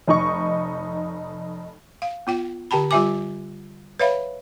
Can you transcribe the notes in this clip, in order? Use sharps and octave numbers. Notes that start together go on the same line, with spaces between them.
F1 D#4 C#6
F5
B3 F4 G5
D3 G4 G5 A5 B5
G3 F4 G4 E5 G#5 D6
B4 C#5 E5 F5 B5